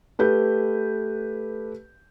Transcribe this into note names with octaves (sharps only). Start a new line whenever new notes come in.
A3 G4 B4 G6